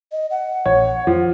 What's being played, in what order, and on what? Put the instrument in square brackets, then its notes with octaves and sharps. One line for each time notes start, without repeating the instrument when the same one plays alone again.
[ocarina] D#5
F#5
[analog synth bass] A#1 [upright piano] C#5
[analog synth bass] F2 [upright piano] F3